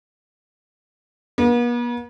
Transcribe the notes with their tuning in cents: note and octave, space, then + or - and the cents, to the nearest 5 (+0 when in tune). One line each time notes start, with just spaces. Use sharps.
B3 -45